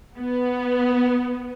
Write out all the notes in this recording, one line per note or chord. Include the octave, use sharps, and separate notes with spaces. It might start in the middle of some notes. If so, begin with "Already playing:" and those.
B3